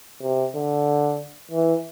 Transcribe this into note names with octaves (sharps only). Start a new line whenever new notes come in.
C3
D3
E3